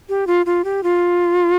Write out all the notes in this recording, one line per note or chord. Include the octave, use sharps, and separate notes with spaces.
G4
F4
F4
G4
F4